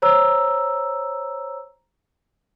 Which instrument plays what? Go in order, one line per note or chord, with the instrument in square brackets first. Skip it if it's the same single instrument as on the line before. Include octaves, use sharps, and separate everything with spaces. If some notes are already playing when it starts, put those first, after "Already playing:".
[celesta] C5 C#5 A#5 E6